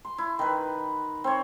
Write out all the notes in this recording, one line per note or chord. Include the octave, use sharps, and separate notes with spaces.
C6
E4
D#3 B4
C4 C#5